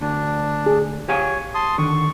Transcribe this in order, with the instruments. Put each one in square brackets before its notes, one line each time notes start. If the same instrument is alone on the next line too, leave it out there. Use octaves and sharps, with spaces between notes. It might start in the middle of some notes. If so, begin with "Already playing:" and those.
[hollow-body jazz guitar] D2 [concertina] D4
[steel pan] G#4
[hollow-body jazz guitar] G4 F5 G#5 [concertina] C#5
[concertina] A5 C6 D#6
[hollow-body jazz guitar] D3 D#3 [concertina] C#6